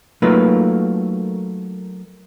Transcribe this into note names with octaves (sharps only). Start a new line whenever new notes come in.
F#3 A3 A#3 D#4 F4 B4